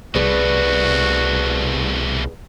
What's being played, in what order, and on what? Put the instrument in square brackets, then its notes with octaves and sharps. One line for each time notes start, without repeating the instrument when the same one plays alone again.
[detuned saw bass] C2 [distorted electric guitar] B2 A3 [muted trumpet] F#4 [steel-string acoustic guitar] G#4 B4 D5